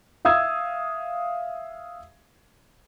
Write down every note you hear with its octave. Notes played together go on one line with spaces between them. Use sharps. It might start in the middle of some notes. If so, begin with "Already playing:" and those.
E5 F5 D#6 E6 G#6